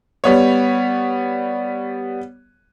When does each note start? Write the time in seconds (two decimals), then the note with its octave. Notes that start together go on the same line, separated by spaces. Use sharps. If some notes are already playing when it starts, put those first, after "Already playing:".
0.24 G3 B3 C#5